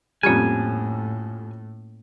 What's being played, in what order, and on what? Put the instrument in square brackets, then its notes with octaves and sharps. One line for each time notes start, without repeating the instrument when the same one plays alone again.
[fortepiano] F2 G3 [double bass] A2 [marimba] A#3 C#4 F4 [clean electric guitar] G#5